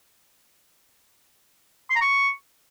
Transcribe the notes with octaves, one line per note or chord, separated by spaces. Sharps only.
C6
A#5
C#6